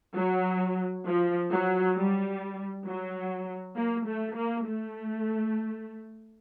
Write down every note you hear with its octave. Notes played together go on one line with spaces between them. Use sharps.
F#3
F3
F#3
G3
F#3
A#3
A3
A#3
A3